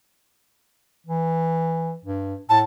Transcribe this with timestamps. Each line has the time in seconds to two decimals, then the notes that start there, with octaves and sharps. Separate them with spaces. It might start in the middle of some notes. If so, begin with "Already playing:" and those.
1.07 E3
2.05 G2
2.50 A2 A5